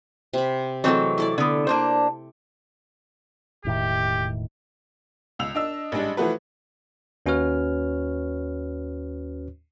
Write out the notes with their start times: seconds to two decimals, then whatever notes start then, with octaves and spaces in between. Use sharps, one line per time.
0.34 C3 B5
0.84 E3 F#3 G#3 A3 C4 A4
1.18 E4 A4 D5
1.38 D3 B3
1.67 A#3 D4 C5
3.65 E1 A2 D#3 G4
5.39 C#2 E6 F7
5.55 D4 D#5 E6
5.92 A1 G3 G#3 D4
6.17 E3 F3 A3 F#4 B4
7.26 D#2 C#4 F#4 B4 C#5 F6